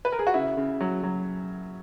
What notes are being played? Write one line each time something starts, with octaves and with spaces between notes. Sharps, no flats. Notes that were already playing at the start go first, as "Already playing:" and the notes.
B4
A#4
G#4
F#4
C#3 E4
C#3
F#3
F#3